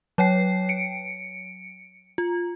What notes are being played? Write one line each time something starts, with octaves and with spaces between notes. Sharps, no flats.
F#3 C#5 G5 C7
C#7 D7
F4